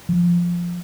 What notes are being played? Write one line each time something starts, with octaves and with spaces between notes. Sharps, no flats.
F3